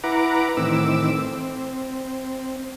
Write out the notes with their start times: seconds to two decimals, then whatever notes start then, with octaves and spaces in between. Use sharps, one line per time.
0.04 E4 B4 F#5 A#5 D6
0.57 A2 D#3 E3 C4 D6 E6
1.18 C4